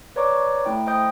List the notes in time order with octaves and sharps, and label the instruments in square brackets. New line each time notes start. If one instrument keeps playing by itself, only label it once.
[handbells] B4 C#5 D5 A#5 C#6 D6
A3 E4 G5
C5 D#5 G5 D#6 G6